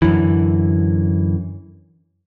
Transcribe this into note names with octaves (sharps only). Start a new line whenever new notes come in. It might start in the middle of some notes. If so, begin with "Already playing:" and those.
F#2 D3 E3